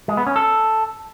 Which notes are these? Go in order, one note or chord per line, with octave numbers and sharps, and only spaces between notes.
G#3
B3
C#4
A4